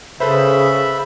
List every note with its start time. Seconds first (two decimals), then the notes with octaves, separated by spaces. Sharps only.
0.20 C#3 A4 B4 C5 E5 B5